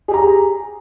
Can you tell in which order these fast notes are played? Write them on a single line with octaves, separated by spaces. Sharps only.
G#4 G4 A#5